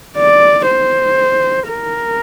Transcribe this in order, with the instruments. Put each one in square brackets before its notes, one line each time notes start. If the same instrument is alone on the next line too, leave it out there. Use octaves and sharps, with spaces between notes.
[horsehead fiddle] D5
C5
A#4